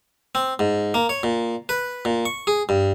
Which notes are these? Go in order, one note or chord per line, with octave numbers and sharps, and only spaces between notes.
C4
G#2
A#3
C#5
A#2
B4
A#2
C#6
G#4
G2